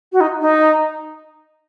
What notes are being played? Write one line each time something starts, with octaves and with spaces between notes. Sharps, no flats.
F#4
D#4
D#4